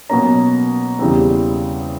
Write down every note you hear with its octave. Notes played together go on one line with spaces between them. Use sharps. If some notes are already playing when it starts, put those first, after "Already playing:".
B2 F#3 A#3 C#4 A#5
E2 C#3 E3 G3 C4